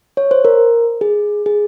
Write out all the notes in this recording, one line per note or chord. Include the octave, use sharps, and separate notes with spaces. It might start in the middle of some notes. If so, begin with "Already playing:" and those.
C#5
C5
A#4
G#4
G#4